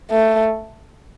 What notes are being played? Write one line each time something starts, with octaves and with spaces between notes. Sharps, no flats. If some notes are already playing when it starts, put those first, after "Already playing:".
A3